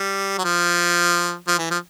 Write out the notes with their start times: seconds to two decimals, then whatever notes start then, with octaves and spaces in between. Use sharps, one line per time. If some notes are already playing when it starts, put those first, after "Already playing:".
Already playing: G3
0.38 F#3
0.44 F3
1.47 F3
1.58 E3
1.70 F3